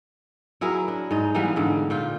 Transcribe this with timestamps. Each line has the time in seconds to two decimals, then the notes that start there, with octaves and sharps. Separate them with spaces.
0.61 F#3 E4 G#4 A#4
0.88 D4
1.11 G#2 D#4
1.35 E3 G3 B3 F5
1.56 G#2 D3
1.90 A#2 F4 G5